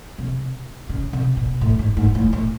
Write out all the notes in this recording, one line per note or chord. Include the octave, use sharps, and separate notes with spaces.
C3
C#3
C3
B2
A2
G#2
G#2
A2
A2